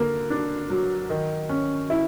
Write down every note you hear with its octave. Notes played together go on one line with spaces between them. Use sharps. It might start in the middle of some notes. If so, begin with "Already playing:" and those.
Already playing: D3 A#3
D4
F#3
D#3
C#4
E4